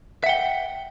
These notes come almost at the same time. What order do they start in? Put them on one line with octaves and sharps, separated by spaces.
E5 F#5 G5